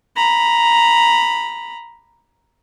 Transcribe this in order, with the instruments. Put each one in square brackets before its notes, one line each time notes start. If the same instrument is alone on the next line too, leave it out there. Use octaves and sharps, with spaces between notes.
[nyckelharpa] A#5 B5